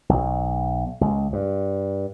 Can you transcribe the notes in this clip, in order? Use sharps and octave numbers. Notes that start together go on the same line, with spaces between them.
B1
C#2
G2